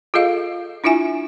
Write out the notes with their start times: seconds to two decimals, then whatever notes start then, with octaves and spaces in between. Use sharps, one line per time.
0.14 F4 G#4 A4 D#5 F5
0.84 D4 E4 F4 E5 G#5